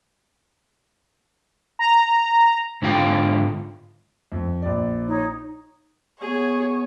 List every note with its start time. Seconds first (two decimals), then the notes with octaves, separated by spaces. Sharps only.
1.79 A#5
2.82 G#2 D3 F4 F5 G5
4.32 F2
4.62 A#1 D5
5.08 D#4 C#5
6.21 B3 G#4 C#5